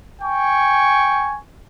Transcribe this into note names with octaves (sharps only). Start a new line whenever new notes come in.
G5 G#5 C#6